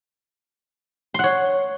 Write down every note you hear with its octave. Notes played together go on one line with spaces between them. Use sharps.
C#5 F#5 C6